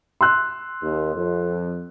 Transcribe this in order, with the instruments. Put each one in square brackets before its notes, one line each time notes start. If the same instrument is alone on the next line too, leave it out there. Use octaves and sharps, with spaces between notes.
[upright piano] C6 E6 F#6
[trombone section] D#2
F2